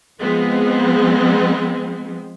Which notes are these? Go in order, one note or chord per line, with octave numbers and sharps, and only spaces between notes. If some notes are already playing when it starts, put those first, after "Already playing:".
F3 G#3 B3 C4